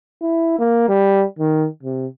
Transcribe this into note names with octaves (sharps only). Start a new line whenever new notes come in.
E4
A#3
G3
D#3
C3